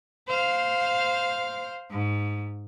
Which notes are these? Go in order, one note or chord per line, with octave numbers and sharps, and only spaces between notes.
C5 F5
G#2